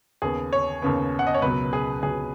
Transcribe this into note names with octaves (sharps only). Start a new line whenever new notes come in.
D#2 C#3 B3 G#4
C#5
D#2 C#3 B3
F#5
D#5
C#5
C#2 B2 F#3 B3 B4
G#4
C#2 B2 F#3 B3 G#4